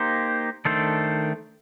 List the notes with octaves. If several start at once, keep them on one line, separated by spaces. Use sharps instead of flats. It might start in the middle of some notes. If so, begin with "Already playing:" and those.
Already playing: A#3 D#4 G4 C5
D#3 A3 D4 A4 C5